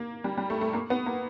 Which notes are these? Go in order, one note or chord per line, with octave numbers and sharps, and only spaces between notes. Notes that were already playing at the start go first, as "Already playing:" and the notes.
Already playing: A#3
G3
G3
A3
A3
A#3
B3
A#3